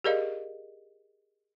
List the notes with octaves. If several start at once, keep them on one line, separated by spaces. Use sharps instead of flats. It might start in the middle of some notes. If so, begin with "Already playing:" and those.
G4 G#4 A#4 D5 D#5 F5